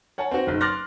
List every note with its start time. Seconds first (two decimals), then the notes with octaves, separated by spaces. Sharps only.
0.18 C#5 F#5 G#5 A5
0.31 C4 F#4
0.47 F#1 B1
0.61 C6 D6 F6 F#6 A6 A#6